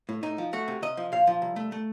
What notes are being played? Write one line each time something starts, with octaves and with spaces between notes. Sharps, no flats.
A2
A2 D#4
F3
A3 F#4
C3
C3 D#5
F3
A#2 F5
F3
C2
A3
A3